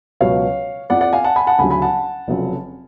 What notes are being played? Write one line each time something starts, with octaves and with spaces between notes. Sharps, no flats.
C#2 B2 F#3 C#5 F5
F2 F3 D5 F#5
D5 F#5
F5 G#5
F#5 A5
G#5 B5
F#5 A5
D2 C#3 F#3 G#5 B5
G#5 B5
F#5 A5
F1 F2 C#3 F#3